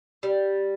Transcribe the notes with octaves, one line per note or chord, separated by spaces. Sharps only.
G3